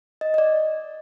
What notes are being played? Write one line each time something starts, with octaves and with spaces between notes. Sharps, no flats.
D#5
D#5
D5